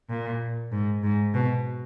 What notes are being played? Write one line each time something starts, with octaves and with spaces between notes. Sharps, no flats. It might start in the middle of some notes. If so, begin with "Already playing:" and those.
A#2
G#2
G#2
B2